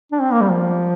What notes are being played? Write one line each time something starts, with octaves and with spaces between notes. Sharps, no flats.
D4
C4
A#3
G3
F3